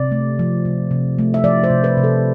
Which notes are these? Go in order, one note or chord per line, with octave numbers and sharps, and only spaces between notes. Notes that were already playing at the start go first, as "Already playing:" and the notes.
Already playing: C3 D5
A3
F3
C3
C3
A3
E5
F3 D5
C5
C3
B4
C3
A4